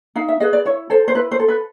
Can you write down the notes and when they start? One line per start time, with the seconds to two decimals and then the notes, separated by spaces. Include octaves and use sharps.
0.16 D#4 F5
0.28 E5
0.40 G#4 B4 D#5
0.53 D5
0.65 E4 C#5
0.90 A4 C5
1.08 C5
1.15 E4 B4
1.31 C5
1.40 A4
1.48 B4